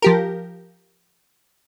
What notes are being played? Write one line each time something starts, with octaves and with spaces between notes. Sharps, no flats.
F3 G4 A#4